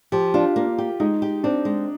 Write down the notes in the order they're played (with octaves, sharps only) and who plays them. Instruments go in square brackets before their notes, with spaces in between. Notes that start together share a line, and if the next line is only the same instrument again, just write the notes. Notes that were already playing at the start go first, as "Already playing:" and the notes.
[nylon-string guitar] F3 [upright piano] G4
[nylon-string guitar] D4 [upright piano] F4
[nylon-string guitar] A#3
G4
[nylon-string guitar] G#3 [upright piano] D#4
[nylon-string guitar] G4
[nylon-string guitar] C4 [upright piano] D4
[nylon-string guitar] G#3